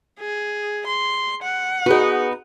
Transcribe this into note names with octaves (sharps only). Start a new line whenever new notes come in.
G#4
C6
F#5
B3 D#4 F#4 G#4